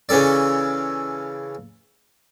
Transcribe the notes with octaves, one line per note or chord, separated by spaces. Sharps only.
C#3 E3 C#4 A4 D5